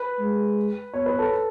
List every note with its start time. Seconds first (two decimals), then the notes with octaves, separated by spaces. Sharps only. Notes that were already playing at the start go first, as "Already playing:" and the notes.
Already playing: B4
0.19 G#3
0.94 B3 C#5
1.06 B4
1.19 A4